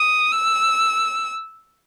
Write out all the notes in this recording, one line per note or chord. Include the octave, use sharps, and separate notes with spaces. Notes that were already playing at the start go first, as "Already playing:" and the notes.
Already playing: D#6
E6